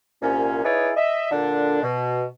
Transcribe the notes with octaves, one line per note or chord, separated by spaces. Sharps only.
C2 A#2 C#4
D#4 E4 G#4 B4 C#5 D5
D#5 E5
A#2 D3 D4
B2